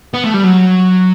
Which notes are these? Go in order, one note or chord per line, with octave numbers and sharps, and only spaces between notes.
B3
A3
G3
F#3